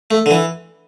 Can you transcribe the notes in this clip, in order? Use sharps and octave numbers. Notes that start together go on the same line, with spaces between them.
A3
D3
E3